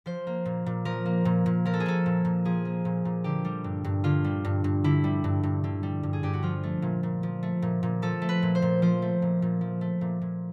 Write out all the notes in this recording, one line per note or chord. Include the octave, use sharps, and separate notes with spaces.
F3 C5
A#3
A#2
A#2
F3 A#4
A#3
A#2
A#2
F3 A#4
A4
G#4
A#3 A4
A#2
A#2
F3 G#4
A#3
A#2
A#2
D3 G4
G3
G2
G2
D3 F4
G3
G2
G2
D3 E4
G3
G2
G2
D3
G3
G2
G#4
G2 G4
F#4
F3 F4
A3
A#2
A#2
F3
A3
A#2
A#2
F3 A4
A3
B4
A#2
C5
A#2
F3 C5
A3
A#2
A#2
F3
A3
A#2
A#2